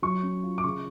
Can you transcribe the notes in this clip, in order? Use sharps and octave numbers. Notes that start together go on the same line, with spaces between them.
F#3 C#6
C#4
F4
D6
C#3 C#6